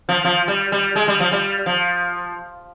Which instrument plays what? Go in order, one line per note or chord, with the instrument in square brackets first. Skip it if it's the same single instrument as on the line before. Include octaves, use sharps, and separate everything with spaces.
[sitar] F3
F3
G3
G3
G#3
G3
F3
G3
F3